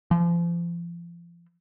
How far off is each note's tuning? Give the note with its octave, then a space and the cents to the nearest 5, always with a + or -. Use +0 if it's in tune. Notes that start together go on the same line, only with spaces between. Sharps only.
F3 -35